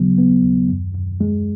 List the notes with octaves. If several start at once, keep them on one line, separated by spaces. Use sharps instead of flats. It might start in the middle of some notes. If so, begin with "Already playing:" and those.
Already playing: D#2 C#3 F#3 B3
B3
D#2
F#2
F#2
G#3